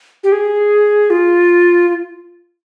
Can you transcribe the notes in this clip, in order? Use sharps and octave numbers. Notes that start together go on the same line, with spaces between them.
G4
G#4
F4
F4